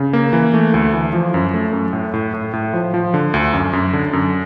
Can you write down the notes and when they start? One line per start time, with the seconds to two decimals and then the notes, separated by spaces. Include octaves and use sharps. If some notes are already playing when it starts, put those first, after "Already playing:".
Already playing: C#3
0.13 A#3
0.33 E3
0.54 A3
0.74 D2
0.93 E3
1.13 F3
1.34 F#2
1.54 A3
1.73 F#2
1.93 A2
2.14 A2
2.34 A2
2.53 A2
2.73 F3
2.94 F3
3.14 D3
3.34 D2
3.53 F#2
3.73 F#2
3.93 D3
4.13 F#2